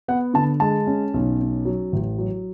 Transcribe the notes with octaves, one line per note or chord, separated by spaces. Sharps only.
B3 F#5
D3 A5
G#3 A5
C#4
B1
C#4
F#3
A1
F#3